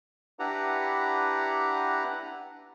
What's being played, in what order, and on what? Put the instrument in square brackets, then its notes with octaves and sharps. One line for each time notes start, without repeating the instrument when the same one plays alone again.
[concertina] D4 E4 G4 B4 F#5 A#5